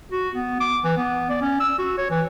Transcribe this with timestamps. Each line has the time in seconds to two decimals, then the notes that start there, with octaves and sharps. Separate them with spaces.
0.12 F#4
0.35 B3
0.60 D6
0.84 E3
0.97 B3
1.30 D5
1.41 C#4
1.60 E6
1.79 F#4
1.98 C#5
2.10 E3